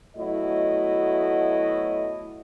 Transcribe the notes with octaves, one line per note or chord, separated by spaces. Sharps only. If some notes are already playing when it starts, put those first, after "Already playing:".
B2 F#3 A3 E4 F#4 D#5